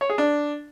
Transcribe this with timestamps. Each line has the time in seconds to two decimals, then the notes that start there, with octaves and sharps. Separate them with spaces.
0.01 C#5
0.10 G#4
0.18 D4